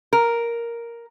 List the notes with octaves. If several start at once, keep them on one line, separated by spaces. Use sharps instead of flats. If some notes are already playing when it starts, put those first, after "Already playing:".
A#4